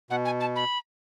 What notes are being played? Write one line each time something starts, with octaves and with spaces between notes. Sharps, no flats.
B2 F#5
G#5
A5
B5